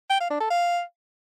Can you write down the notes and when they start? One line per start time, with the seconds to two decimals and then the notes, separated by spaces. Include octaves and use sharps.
0.10 G5
0.20 F5
0.30 D4
0.40 A4
0.51 F5